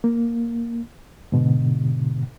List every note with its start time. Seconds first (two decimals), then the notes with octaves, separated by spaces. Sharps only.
0.04 A#3
1.32 G#2 B2 D3